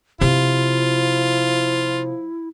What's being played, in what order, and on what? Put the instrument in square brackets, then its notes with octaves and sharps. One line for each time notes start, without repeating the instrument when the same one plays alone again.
[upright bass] C3 [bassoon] F3 [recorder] E4 [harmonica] F4